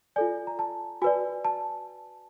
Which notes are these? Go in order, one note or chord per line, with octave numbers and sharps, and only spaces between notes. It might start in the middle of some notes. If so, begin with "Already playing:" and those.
F4 A4 D5 G#5
A#5
A5
F#4 B4 D5 G#5
A5